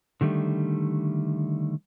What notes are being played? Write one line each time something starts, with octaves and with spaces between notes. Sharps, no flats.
D3 D#3 G3 A3